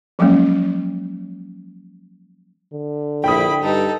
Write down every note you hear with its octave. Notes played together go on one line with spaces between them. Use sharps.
F3 F#3 G#3 A#3 C#4
D3
A#1 E4 G5 B5 D#6
G2 D#4 A4